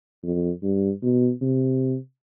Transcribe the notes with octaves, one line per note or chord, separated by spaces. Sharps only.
F2
G2
B2
C3